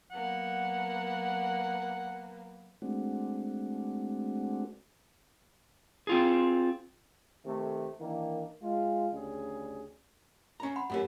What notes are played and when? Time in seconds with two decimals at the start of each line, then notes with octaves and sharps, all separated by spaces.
0.11 F#3 A#3 B3 F#5
2.82 G#3 A3 C4 D4 F#4
6.07 C4 F4 G#4
7.44 C3 D#3 A3
7.99 D#3 E3 A#3 D4
8.61 G#3 F4
9.12 D2 C#3 G3 G#4
10.60 C#4 A#5
10.76 F#5 B5 C6
10.90 F#2 A3 C#4 F#4 G4 A#4 F#5